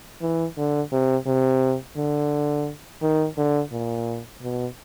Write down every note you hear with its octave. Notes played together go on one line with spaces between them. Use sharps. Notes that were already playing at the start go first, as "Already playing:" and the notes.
E3
D3
C3
C3
D3
D#3
D3
A#2
B2